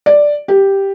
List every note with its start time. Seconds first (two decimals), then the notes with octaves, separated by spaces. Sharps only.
0.06 D5
0.48 G4